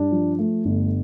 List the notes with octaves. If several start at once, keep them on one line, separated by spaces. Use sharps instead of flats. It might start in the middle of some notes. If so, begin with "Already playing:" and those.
Already playing: G2 D4
F3
A3
G1